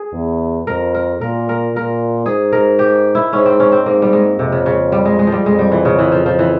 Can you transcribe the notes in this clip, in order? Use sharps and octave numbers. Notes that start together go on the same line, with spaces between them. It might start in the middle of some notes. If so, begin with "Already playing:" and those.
Already playing: G#4
E2
F2 A#4
A#4
A#2 A#4
A#4
A#2 A#4
G#2 G#4
A#4
G4
E4
G#2 C#4
C4
C#4
C4
G#2 A#3
G3
G#3
F2 C3
C#3
C#3
G3
G#3
G#3
F3
G3
F2 G#3
G3
E3
C#3
E3
F3
F3
E3